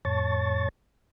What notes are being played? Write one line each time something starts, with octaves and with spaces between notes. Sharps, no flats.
F2 A2 C#5 A5 C#6 A6